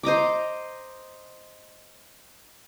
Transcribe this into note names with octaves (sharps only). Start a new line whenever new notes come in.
C5 D#5 A#5 D6